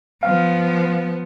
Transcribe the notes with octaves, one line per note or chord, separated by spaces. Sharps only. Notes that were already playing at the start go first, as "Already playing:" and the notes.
F3 B3 F5